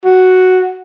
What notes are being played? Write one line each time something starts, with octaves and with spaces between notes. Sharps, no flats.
F#4